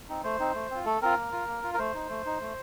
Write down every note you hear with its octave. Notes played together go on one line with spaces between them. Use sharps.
C4 D#4
A3 C5
C4 D#4
A3
C4 F4
A3 A4
C4 F4 A#4
A#3
F4
A#3
F4
A#4
A3 C5
D#4
A3
D#4
A3